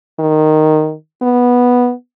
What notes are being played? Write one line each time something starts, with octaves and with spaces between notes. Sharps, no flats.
D#3
B3